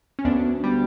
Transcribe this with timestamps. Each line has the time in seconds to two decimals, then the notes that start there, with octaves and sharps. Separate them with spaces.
0.19 C#4
0.25 D2 B3 D4
0.64 G3